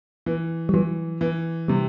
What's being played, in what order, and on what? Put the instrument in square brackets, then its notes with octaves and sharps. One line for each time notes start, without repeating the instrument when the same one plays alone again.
[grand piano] E3
[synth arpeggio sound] G3
[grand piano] E3 [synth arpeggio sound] F#3
[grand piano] E3
[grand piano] C3 [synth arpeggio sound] G3